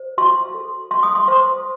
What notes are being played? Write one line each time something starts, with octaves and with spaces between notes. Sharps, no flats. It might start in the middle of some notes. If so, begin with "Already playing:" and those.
Already playing: C5
F#4 C6
A4
F#4 C6
D#6
C6
C5 C6